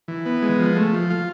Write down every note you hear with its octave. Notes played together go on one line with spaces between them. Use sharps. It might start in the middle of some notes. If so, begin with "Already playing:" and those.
E3
B3
G#3
F3
A3
F3
F4